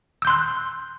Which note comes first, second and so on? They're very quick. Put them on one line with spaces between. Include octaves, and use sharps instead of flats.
E6 G6 C6 F#6